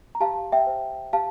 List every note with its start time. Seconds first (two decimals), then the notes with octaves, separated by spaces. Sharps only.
0.15 A#5
0.20 G4 F5 A5
0.52 E5 G5
0.67 C5
1.13 G4 F5 A5